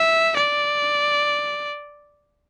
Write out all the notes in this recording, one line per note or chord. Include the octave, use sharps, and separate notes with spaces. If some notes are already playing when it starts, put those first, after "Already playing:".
Already playing: E5
D5